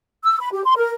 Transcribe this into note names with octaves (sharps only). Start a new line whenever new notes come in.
E6
B5
G4
C6
A#4